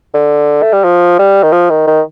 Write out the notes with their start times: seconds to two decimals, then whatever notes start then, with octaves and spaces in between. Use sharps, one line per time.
0.14 D3
0.62 A3
0.73 G3
0.84 F3
1.19 G3
1.43 D#3
1.52 F3
1.70 D#3
1.87 D#3